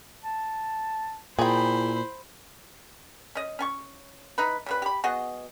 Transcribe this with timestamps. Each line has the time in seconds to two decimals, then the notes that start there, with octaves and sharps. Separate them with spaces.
0.23 A5
1.39 A#2 E4 G#4 C5 G5 B5
3.35 C#4 D#5
3.59 C#4 G#5 C#6
4.38 D#4 E4 B4
4.66 C#3 G3 B4
4.82 G4 B5
5.04 B3 F#4 G#4 D#5